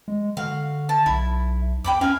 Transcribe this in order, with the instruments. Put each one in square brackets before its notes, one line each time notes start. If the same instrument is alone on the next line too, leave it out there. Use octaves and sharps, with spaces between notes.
[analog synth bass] G#3
[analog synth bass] D3 [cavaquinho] F#4 F5
[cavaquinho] A5
[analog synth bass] B1 [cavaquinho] E4
[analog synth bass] E2 [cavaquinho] G5 B5 D6
[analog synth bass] C#4 [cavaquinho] F5 G#5